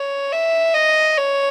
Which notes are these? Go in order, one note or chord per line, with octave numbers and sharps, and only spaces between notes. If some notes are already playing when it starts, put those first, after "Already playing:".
Already playing: C#5
E5
D#5
C#5